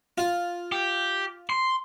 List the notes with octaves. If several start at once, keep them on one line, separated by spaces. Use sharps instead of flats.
F4
G4
C6